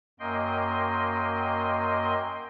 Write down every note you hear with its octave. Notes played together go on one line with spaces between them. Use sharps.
F#2 A#3 D#5 G5 C6